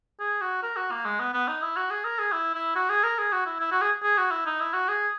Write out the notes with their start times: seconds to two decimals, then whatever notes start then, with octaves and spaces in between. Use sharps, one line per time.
0.20 G#4
0.41 F#4
0.63 A#4
0.77 F#4
0.91 A#3
1.05 G#3
1.20 B3
1.34 B3
1.48 D#4
1.62 E4
1.77 F#4
1.91 G#4
2.05 A#4
2.19 G#4
2.32 E4
2.55 E4
2.76 F#4
2.90 G#4
3.04 A#4
3.19 G#4
3.33 F#4
3.46 E4
3.60 E4
3.72 F#4
3.82 G#4
4.03 G#4
4.18 F#4
4.31 E4
4.46 D#4
4.60 E4
4.74 F#4
4.89 G#4